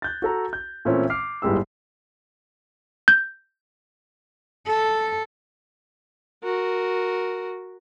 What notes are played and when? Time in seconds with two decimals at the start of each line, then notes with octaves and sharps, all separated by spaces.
0.02 F#6 G6 A6
0.22 F#4 A4 A#5
0.53 G6
0.85 A#2 E3 A3 C4 C#4 E4
1.10 D6 F6 C7
1.42 G1 A2 G3 G#3 G4 E6
3.08 G6
4.67 A4
6.43 F#4 A#4